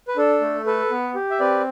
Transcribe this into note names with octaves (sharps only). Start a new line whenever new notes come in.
B4
D4 A4
A3
A4 B4
B3
G4
E5
C4 B4 D5